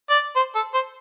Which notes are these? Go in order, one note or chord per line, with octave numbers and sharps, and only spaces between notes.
D5
C5
A4
C5